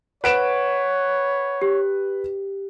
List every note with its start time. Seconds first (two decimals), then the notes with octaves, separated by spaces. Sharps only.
0.24 B4 C#5 F#5 D7 E7
1.62 G4